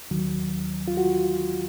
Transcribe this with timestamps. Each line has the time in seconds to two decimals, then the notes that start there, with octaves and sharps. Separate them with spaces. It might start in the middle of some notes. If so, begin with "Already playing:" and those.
0.11 D#2 D#3 F#3
0.88 F4
0.97 F#4